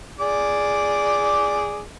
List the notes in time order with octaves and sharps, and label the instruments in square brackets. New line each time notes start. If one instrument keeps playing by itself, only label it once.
[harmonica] G#4 D5 D6